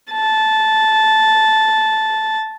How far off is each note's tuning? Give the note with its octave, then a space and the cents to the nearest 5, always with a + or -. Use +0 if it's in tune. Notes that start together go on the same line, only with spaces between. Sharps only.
A5 -10